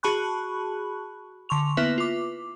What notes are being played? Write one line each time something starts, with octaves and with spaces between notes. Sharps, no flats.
F#4 G#4 A5 B5 C#6 F#6
D3 C6 C#6 F7
A#3 B3 E4 B4 E5
F4 D6